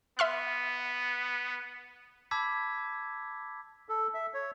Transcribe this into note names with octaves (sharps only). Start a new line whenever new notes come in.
B3 E5 C6 F6
A5 B5 D6 E6 G#6 B6
A4
E5
C#5